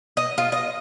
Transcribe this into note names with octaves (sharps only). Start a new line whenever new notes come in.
D#5
F4
D#5